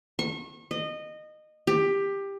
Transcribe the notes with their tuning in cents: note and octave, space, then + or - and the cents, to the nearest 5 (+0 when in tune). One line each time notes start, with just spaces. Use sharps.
C#6 -35
D#5 -20
G4 +15